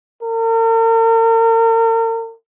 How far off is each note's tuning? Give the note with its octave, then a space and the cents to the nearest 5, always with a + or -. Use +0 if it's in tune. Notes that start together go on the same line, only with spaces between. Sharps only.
A#4 -40